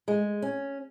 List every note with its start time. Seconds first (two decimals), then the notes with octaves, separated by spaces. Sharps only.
0.08 G#3
0.42 C#4